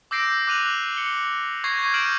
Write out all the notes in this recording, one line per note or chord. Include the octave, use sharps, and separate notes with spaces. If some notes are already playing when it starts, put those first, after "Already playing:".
D6 E6 G6 A#6 C7 D7
D6 F#6 D#7 F7 F#7
C#7 G7
C#6 G#6 A#6 C7
G6 G#6
F6 G6 G#6 D7 E7 F#7